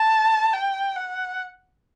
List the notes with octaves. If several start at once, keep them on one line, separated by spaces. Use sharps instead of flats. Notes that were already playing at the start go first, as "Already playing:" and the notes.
Already playing: A5
G5
F#5